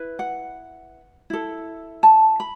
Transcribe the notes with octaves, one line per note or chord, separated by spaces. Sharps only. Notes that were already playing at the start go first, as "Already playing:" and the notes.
Already playing: E4 B4
F#5
E4 A4
A5
B5